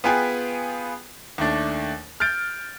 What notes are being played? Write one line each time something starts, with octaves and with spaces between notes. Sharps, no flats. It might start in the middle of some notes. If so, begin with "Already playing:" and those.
B3 F4 G#4 B4 G5 G#5
D#2 A3 D4
F6 G6 A6 D7